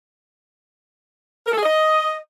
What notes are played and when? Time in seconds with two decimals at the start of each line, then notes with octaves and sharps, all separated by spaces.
1.46 A#4
1.52 A4
1.58 G#4
1.63 D#5